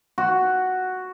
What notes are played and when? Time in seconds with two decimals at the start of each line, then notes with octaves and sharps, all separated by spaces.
0.18 F#4